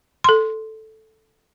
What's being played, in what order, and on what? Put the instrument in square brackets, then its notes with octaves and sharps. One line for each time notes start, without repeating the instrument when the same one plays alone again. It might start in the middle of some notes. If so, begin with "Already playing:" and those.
[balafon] A4 C6